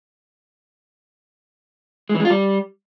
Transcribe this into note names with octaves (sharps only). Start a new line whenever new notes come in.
G#3
E3
G#3
F4
G3